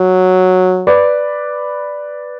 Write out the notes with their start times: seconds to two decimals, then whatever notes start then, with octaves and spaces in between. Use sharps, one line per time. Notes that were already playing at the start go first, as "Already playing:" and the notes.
Already playing: F#3
0.87 B4 D5